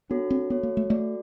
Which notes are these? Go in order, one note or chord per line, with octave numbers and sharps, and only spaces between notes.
B3 D4 F#4 A4 C#5
C4
B3 F#4 A4 C#5
A#3
A3
A3 F#4 A4 D5